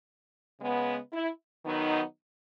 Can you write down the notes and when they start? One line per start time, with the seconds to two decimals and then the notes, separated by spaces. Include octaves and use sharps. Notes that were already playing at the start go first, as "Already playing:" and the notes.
0.61 C#3 G#3 B3
1.13 E4
1.65 D#3 F#3 B3 D#4